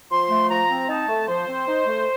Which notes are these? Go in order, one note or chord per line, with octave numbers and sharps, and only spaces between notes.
F3 C6
A3
F3 A#5
C4
D#4 A5
A3
F3 C5
C4
D#4
A3